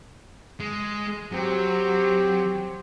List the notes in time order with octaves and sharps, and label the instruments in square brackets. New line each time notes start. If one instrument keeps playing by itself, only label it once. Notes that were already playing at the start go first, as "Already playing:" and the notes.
[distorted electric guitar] G#3
[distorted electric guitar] F#3 [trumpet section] C4 G4